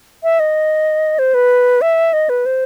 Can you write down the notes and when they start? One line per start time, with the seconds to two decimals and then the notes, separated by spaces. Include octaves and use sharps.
0.23 E5
0.40 D#5
1.19 C5
1.34 B4
1.81 E5
2.13 D#5
2.29 B4
2.46 C5